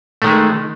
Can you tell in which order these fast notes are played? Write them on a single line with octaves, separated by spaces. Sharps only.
A3 D#3 G#3